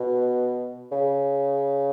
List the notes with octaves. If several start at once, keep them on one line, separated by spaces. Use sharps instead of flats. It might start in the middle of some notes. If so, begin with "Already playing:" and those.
Already playing: B2
C#3